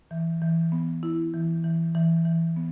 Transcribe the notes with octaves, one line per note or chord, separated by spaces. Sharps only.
E3
E3
B3
E4
E3
E3
E3
E3
B3